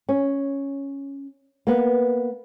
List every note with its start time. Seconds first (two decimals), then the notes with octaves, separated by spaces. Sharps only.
0.09 C#4
1.67 A#3 B3